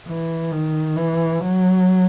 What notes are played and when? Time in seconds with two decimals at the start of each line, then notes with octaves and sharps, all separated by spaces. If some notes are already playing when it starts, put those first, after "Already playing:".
0.08 E3
0.52 D#3
0.96 E3
1.40 F#3